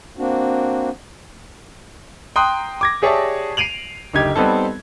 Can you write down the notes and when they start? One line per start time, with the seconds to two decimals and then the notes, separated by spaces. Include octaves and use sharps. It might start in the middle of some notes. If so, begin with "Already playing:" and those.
0.18 A#3 C4 D4 F#4
2.36 G5 A#5 C6 D#6 F#6
2.81 D6 G#6 A#6
3.02 G4 G#4 C#5 D5 E5 A5
3.57 C7 D7 D#7 F7 F#7
4.13 F#1 D2 D#4 G4 G#6
4.36 G3 B3 C4 D#4 A4